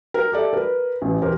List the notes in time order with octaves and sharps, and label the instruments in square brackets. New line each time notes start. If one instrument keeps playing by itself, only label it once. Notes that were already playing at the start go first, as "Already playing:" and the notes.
[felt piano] A#4
G4 A4 D5 E5
A#4 B4
A1
E1 G4 A#4 C5